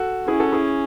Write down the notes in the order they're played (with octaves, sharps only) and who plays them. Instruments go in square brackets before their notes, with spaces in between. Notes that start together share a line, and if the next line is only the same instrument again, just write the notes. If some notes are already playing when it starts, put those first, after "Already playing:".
Already playing: [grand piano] F#4 A4
[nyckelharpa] C#4 [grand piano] E4 G#4
[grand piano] F#4 A4
E4 G#4